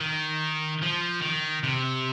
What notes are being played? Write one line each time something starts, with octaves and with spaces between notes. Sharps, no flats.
D#3
F3
D#3
C3